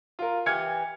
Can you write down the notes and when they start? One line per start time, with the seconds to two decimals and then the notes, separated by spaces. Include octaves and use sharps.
0.19 F4 A#4
0.46 E3 G4 F6 G#6 C#7